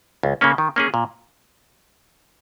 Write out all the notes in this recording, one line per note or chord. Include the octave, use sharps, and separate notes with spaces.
C#2
C#3 A#3 C#4
D#3
A#3 C#4 G#4
A#2